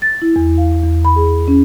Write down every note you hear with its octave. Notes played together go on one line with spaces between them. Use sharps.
A6
E4
E2
F5
E2
B5
G#4
C#4